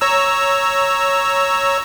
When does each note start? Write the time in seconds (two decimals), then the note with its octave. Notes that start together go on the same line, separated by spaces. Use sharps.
0.01 C#5 A#5 E6